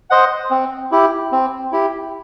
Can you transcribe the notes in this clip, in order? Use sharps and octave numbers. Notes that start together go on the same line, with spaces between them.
C5 D#5 F#5
C4
E4 G4
C4
E4 G4